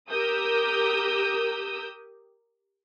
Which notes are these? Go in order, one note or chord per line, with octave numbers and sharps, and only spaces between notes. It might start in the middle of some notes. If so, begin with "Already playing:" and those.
G4 A#4 D#6 E6 G6